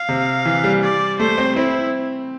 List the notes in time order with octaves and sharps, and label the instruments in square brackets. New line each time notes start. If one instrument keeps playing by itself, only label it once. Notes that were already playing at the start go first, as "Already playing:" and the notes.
Already playing: [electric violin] F5
[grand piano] C3
E3
G3
[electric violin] D5
[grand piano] A3 [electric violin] C5
[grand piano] C4
[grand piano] C4 [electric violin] E4